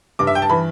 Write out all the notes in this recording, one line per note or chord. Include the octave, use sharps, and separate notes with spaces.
G2 D6
E5
G5
A5
E3 B5